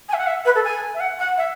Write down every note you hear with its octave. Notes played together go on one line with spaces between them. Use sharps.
G#5
E5
F#5
E5
B4
A4
G#5
E5
F#5
F#5
E5